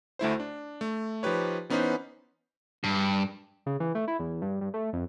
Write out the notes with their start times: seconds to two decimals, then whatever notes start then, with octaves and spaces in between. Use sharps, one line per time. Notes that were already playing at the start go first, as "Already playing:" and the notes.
0.19 D2 A3 E4 C5
0.40 D4
0.81 A3
1.23 F3 D#4 G4 B4 C#5
1.70 E3 B3 C#4 D#4 B4 C5
2.84 G2
3.66 C#3
3.80 E3
3.95 A3
4.08 E4
4.20 E2
4.42 G2
4.61 G2
4.74 A3
4.93 F2